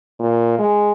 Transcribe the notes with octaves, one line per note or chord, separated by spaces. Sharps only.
A#2
G#3